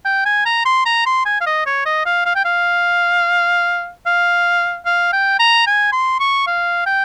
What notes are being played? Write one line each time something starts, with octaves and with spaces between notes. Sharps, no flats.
G5
G#5
A#5
C6
A#5
C6
G#5
F5
D#5
C#5
D#5
F5
F5
G5
F5
F5
F5
G5
A#5
G#5
C6
C#6
F5
G5